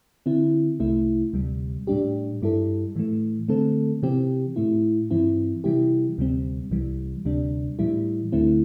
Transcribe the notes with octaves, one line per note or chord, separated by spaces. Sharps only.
D3 C4 E4
C2 C3 A3 E4
D2 C3 G3
A2 G3 D4 G4
G2 G3 E4 A4
A2 E3 A3
D3 A3 C4 A4
C3 E3 C4 G4
A2 A3 E4
G2 E3 C4 E4
C3 E3 G3 E4 G4
D2 C3 G3 C4
C2 C3 E3 G3
D2 C3 G3 D4
A2 E3 G3 E4
D2 D3 A3 C4 E4